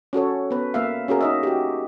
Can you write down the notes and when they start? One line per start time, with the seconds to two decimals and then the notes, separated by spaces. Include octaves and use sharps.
0.13 C#4 F#4 A4 C#5
0.51 B3 B4
0.74 A#3 E5 F5
1.08 C#4 F#4 G#4 A#4
1.21 D#4 D#5 E5
1.43 F#4 G4